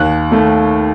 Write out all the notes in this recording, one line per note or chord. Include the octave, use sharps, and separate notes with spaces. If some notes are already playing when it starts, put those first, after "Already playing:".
Already playing: D#2 F#6
D#3 A3